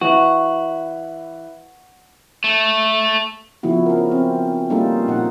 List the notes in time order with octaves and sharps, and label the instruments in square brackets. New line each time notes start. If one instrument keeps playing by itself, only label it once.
[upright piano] E3 B4 [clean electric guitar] F#4
[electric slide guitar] A3
[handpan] C#3 F3 B3 E4 F#4
C#4 A#4
C4
G3 A#3 C#4 D#4 F4 A4
A#2 D#4 F#5